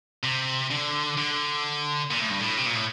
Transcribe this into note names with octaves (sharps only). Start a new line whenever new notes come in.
C3
D3
D3
A#2
A2
G2
A2
C3
A#2
A2